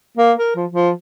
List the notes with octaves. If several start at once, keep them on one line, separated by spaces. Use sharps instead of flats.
A#3
A#4
F3
F3